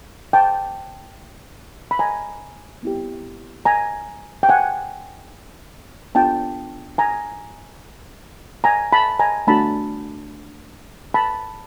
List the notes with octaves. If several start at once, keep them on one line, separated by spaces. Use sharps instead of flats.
G5 A5
B5
G#5 A#5
B3 E4 G4
G#5 A#5
G5
F#5 G#5
B3 D4 F4 G5 A5
G#5 A#5
G#5 A#5
A5 B5
G#5 A#5
A3 D4 F#4 A5 B5
A5 B5